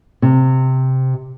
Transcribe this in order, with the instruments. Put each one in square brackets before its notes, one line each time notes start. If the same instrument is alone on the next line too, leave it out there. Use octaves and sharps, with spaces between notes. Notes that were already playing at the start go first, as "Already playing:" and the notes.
[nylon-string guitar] C3